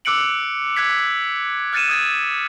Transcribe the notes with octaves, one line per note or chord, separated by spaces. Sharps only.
D6 E6 F#6 C#7 D7 F#7
F#6 G#6 B6
F6 F#6 A6 C#7 D#7 E7
D#6 G#6 A6